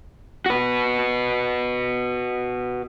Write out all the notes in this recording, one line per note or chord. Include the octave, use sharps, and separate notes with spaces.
F#4 B4